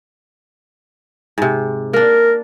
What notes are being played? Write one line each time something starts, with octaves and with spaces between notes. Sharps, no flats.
G#2 C3
A#3 D4 A#4